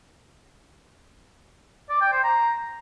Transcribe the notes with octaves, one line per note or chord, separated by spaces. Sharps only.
D5
G5
C5
A#5